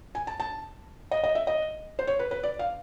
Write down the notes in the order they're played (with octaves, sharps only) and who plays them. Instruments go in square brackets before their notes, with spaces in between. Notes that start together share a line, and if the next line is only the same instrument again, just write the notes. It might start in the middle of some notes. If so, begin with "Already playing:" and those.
[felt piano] G#5
A5
A5
D#5
D#5
E5
D#5
C5
C#5
B4
B4
D5
F5